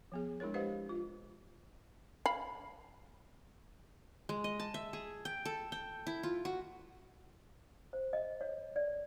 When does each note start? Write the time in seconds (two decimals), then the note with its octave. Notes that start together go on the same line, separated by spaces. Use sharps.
0.12 F3 B3 G#4
0.40 G#3 D4 E4 A#4 C#5
0.54 G4 B4 C5 D#5 F5 F#5
0.89 F4
2.26 F5 B5
4.29 G#3
4.44 D#5
4.60 A5
4.74 E5
4.93 G#4
5.25 G5
5.45 A4
5.72 G5
6.07 E4
6.23 F4
6.45 F#4
7.93 C5
8.13 D#5
8.41 C#5
8.76 D5